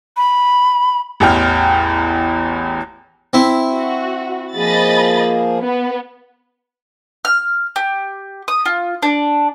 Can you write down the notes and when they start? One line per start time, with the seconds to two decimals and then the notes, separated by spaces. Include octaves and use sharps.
0.17 B5
1.20 A1 E2 G5 F6
3.33 C4 E4
3.71 F#4
4.56 F3 A#3 G#4 D#5 B5 A6
5.60 B3
7.25 F6
7.76 G4
8.48 D#6
8.65 F4
9.03 D4